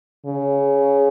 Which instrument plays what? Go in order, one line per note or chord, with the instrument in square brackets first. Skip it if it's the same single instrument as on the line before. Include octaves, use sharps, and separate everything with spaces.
[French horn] C#3